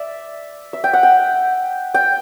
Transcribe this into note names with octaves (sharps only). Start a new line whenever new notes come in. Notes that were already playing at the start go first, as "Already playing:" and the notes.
Already playing: D5 E5
E5
G5
F#5
G5
G5